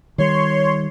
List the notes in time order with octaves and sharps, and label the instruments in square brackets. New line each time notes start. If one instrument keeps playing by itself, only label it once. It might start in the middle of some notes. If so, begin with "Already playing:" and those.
[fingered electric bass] D#3 G3 [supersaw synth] C#5 C6